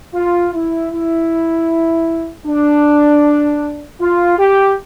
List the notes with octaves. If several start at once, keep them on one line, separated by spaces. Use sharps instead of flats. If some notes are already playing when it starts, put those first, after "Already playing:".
F4
E4
E4
D4
F4
G4